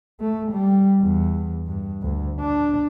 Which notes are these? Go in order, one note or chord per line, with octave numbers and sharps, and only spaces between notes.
A3
G3
E2
G2
D2
D4